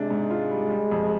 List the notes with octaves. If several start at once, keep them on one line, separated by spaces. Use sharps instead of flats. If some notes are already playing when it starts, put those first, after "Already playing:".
Already playing: C3 G#3 D4
G#2
F4
G3
G3
F2